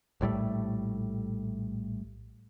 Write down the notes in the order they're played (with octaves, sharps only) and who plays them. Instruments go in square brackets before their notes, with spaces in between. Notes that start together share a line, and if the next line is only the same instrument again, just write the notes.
[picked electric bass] A#1 A2 G3 A3